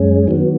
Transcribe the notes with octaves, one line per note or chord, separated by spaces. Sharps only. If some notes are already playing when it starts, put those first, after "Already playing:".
Already playing: F#2 G#3 C#4
D#3 F#3 B3